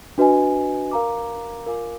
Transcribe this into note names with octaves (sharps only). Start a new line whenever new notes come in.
D4 F#4 B4 D#5 G#5
A#4 F5 A#5 D6
F4 A#4 F5 G#5 D6